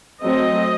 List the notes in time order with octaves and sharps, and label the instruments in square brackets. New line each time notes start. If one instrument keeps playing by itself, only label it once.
[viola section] F#3 A3 C4 D#5